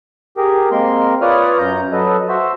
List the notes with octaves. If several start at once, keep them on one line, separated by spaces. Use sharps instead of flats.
G4 G#4 A#4
G#3 A#3 C4 A#4 C6
F4 B4 C#5 D5 D#6 F6
F#2 A#5 G6
F#3 A4 B4 D#5
F#4 C5 E5